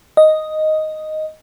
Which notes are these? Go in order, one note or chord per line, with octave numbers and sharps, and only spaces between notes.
D#5